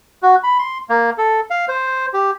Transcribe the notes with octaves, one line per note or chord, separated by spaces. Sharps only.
F#4
B5
C6
A#3
A4
F5
C5
G4